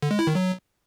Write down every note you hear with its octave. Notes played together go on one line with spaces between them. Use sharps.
D3
G#3
E4
D#3
F#3